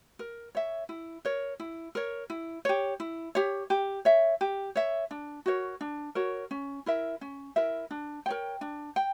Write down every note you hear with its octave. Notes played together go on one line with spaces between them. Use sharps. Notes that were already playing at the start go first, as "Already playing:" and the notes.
A#4
C#5 E5
E4
A#4 C#5
E4
A#4 C#5
E4
G4 C#5
E4
G4 C#5
G4
C#5 E5
G4
C#5 E5
D4
F#4 A#4 C#5
D4
F#4 A#4 C#5
C#4
E4 A#4 E5
C#4
E4 A#4 E5
D4
A#4 C#5 G5
D4
G5